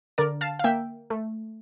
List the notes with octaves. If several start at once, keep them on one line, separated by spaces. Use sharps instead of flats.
D3 A#4 D5
F5 A5
F5
A#3 E5 G5
A3